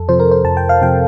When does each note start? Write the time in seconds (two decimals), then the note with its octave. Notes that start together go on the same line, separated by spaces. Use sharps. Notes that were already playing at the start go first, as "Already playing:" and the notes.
Already playing: F2 A4
0.09 C3 F3 C5
0.20 A#4
0.31 C5
0.44 F2 A5
0.57 G5
0.69 F5
0.81 C3 F3 G5